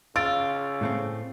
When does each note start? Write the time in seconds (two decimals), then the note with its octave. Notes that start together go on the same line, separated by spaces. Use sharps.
0.16 C#3 F4 E6 A6 D7
0.81 A2 A3 C4